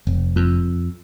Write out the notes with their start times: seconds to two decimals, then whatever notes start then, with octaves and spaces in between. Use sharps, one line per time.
0.07 F1
0.36 F2